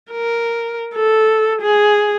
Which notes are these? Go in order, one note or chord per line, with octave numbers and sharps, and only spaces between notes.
A#4
A4
G#4